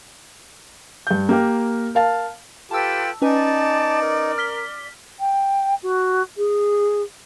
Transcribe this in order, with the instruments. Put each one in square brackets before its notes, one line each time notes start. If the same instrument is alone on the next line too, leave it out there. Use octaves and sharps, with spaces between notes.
[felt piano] G2 G6
A#3 G4 A#4
A#4 F5 A5
[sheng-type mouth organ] F4 [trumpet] G4 [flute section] A4 B4 G5 [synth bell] A5 E6
[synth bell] C#4 B4 G#5 [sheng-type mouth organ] D#4 [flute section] D5 D6 [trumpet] A5
[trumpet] A#4
[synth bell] F6 B6 G7
[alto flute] G5
F#4
G#4